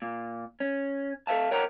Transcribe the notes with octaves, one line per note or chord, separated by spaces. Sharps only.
A#2
C#4
A4 C5 E5 F5 A5
A#4 C#5 F#5 G5 A#5